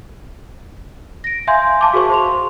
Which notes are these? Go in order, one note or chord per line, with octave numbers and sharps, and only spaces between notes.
A#6 D7
E5 F5 G#5 C6 G6 G#6
F5 A5 D6
F#4 G#4 A#4 C5 C#6
C5 C6 F7